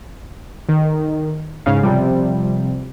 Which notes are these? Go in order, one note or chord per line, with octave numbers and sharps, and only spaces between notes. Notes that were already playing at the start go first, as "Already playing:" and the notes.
D#3
G#2 C#3 F5
C3 F3 G3